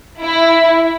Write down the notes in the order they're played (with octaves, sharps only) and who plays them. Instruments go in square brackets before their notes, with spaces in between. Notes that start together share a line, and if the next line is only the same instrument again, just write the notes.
[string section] E4